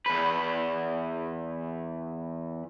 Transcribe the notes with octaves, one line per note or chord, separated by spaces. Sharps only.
E2 B4